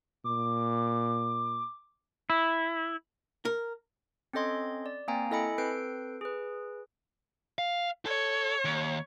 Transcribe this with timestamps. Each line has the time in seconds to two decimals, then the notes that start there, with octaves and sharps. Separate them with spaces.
0.24 A#2 D6
2.30 E4
3.45 A#4
4.33 C4 C#4 A4 D#5 C6 G#6
4.86 D5
5.08 A#3 C4 F5 G5 G#5 A#5
5.31 E4 A4 D#5 G#5 B5 C#7
5.58 C4 A4 B4 G6 C7 D7
6.21 G#4 B4
7.58 F5
8.06 A4 C#5
8.65 D#2